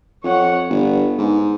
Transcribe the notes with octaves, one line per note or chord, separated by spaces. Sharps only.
F2 C#5 F#5
G1 B3
G#2